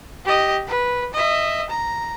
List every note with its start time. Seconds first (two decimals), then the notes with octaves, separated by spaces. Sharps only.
0.25 G4 D#5
0.67 B4
1.14 D#5 E5
1.70 A#5